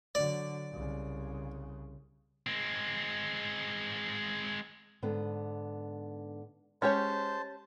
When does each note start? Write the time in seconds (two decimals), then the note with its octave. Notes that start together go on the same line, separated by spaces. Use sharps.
0.15 D3 F#3 D5
0.72 C2 C#3
2.47 G#3 C4
5.02 G#2 D3 B3
6.82 G#3 C#4 G4 C5 C#5 A5